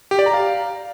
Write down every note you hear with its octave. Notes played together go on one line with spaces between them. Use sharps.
G4
D5
A#5
F5